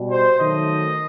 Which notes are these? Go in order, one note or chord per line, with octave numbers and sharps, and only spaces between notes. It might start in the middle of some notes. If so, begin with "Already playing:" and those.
Already playing: B2 G3
C5
D#3 F#3 A3 D#5